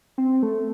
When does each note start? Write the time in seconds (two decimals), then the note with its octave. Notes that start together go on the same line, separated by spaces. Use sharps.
0.18 C4
0.43 A3